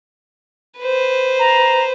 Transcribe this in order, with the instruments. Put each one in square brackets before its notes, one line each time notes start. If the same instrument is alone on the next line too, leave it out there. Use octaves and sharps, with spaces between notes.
[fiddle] B4 C5
[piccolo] A#5